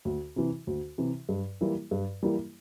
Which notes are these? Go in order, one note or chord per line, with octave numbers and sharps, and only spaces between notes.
D2
C3 E3
D2
C3 E3
G2
E3 G3 A#3 E4
G2
E3 G3 A#3 E4